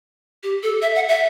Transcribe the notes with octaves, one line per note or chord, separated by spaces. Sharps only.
G4
A4
E5
F#5
E5